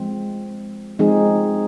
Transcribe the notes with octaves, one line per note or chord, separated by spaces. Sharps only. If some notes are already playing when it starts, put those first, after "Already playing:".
Already playing: F3 G#3 C4
F3 G#3 C4 D#4 G#4